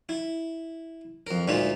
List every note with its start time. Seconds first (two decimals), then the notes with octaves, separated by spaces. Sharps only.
0.09 E4
1.27 F2 A#4
1.48 D2 A#2 G#3 D#4 E5